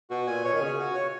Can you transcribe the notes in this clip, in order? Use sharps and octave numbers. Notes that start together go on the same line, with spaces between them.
B2 F#4
A#2 G#5
B2 C#5
D#3
C#3 G#5
F#4
C#5